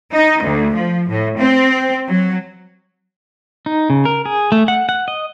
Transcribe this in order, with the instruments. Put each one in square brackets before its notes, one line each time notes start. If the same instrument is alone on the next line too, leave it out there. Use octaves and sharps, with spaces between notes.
[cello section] D#4
D2
F3
A2
C4
F#3
[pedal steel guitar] D#4
C#3
A#4
G#4
A3
F#5
F#5
D#5